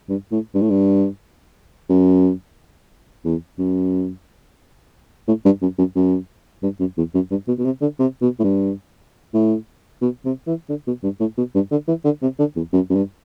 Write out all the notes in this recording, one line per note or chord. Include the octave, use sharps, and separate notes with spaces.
G2
A2
G2
A2
G2
F#2
E2
F#2
A2
G2
F#2
F#2
F#2
G2
F#2
E2
F#2
G2
B2
B2
C3
D3
C3
B2
A2
G2
A2
B2
C3
E3
D3
B2
G2
A2
B2
G2
D3
E3
D3
C3
D3
E2
F#2
F#2
G2